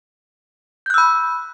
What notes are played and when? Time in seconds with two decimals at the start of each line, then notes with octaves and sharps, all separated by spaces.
0.86 G6
0.90 F#6
0.94 E6
0.98 B5